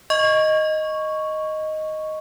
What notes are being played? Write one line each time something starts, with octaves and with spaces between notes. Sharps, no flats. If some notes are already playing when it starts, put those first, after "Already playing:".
D#5 C#6